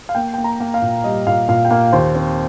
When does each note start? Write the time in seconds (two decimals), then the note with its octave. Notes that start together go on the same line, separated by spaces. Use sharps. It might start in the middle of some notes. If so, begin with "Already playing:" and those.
0.09 F5
0.15 A#3 G5
0.34 A#3 G5
0.44 A#5
0.60 A#3
0.74 F5
0.82 A#2
1.04 G3 D#5
1.27 A#2 F5
1.48 A#2 F5
1.65 G5
1.71 A#3 F5
1.93 D#2 C5
2.15 C4